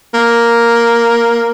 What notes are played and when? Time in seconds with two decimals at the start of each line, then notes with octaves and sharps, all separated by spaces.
0.14 A#3